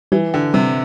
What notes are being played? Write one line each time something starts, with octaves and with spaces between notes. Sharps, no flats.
E3 G3
D3 G4
C3 G3